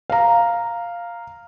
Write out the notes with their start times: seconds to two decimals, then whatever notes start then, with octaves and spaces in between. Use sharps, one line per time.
0.10 F5 A#5